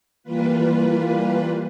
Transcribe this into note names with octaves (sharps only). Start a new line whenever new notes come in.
E3 G3 A#3 F4 B4